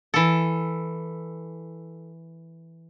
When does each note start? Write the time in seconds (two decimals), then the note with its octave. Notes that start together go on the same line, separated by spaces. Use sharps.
0.14 E3 A4